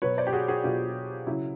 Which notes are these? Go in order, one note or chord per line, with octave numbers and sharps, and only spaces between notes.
B2 F#3 B4 C#5
C5 D5
G4
F#4 G#4
F#4 G#4
B2 F#3 F4 G4
C#3 F#3 E4